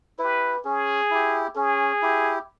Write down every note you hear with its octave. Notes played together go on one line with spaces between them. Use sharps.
E4 B4
G4
C#4 G#4
E4 G4
C#4 G#4
E4 G4